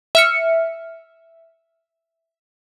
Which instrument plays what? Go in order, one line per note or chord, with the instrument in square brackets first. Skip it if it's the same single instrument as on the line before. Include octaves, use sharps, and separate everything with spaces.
[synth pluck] E5 F6 C#7